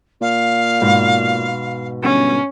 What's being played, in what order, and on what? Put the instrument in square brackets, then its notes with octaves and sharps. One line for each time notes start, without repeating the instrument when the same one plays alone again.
[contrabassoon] A#2 [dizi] F5
[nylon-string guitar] G#2 B2
[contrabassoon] G1 [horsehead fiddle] C#4